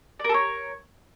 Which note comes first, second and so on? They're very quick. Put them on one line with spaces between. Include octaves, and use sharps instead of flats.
D5 A#4 A4 C#5